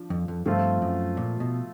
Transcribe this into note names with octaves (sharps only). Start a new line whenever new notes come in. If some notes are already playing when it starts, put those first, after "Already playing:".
Already playing: F3 D4
F2
F2
G2 F3 A3 C4 F4
F#2
A#2
B2